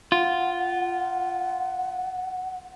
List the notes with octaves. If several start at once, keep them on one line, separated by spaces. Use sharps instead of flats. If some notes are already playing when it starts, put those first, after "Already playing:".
F4 F#5